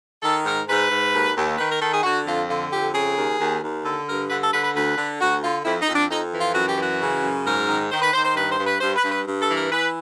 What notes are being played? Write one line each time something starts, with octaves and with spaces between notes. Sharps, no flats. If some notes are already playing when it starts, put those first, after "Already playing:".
D#3 A4
G#2 A#4
G#2 B4
G#2
D#2
D#2
D#3 B4
A#4
D#3 A4
G#4
D3 F#4
F2 F4
D3 F4
F2 G4
C#3 G#4
D#2
D#2
D#2
D3 A4
G2 A#4
D3 B4
A4
D3 B4
B4
D2 B4
D3
D2 F#4
D3 F4
F2 E4
D#4
F2
D4
F2 D#4
E3
F4
F#2 F#4
G4
E3 F#4
C#3
F#2
G#2 A#4
D#3
D#3 C5
B4
D#3 C5
C5
G2 B4
C5
G2
B4
G2 C5
B4
G2
B4
G2
A4
E3
A#4
E3 B4